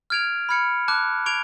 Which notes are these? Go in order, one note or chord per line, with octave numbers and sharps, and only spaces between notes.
F6 G#6 D7 F7
B5 F6 G#6 C#7
A5 D6 F#6
C#6 G#6 D7 F7